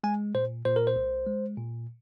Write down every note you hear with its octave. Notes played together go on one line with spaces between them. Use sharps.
G#3 G#5
A#2 C5
A#2 C5
A#4
C5
C2
G#3
A#2